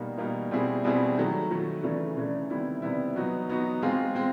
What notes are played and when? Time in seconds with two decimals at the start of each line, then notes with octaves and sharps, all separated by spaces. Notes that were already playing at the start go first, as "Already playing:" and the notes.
Already playing: B2 G3 A#3 D#4
0.17 B2 G3 A#3 D#4
0.51 B2 G3 C4 E4 G#4
0.84 B2 G3 C4 E4 G#4
1.18 D#3 F#3 A3
1.51 D#3 F#3 A3
1.83 C#3 E3 A3 D4
2.16 C#3 E3 A3 D4
2.50 C3 D#3 G3 B3 E4
2.82 C3 D#3 G3 B3 E4
3.15 F#3 B3 D#4 F#4
3.49 F#3 B3 D#4 F#4
3.82 G#3 C4 F4 G#4
4.15 G#3 C4